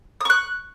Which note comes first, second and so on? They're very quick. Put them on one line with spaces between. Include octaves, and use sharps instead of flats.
D#6 C#6 F#6